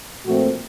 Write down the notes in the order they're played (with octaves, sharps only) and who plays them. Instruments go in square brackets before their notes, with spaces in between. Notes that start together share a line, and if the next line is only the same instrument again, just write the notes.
[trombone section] A#2 F3 A3 C4 F#4